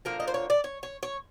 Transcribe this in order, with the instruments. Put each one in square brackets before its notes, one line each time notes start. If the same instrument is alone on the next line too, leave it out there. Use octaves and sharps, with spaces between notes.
[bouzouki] D3 F3 A#3 A#4
D#5
C5
C#5
D5
C#5
C#5
C#5